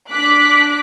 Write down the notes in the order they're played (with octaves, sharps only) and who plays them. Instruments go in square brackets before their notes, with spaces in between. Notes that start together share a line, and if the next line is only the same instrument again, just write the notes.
[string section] D4 D6 F#6 B6